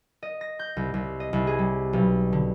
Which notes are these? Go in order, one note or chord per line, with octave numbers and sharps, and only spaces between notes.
D#5
A#6
G6
C2
C2
D#5
C2
G#4
G3
B1
D3